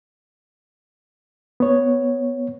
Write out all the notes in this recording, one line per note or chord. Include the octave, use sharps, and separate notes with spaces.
B3 C#5